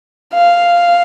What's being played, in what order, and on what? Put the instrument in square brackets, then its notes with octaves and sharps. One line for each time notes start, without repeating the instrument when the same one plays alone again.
[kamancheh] F5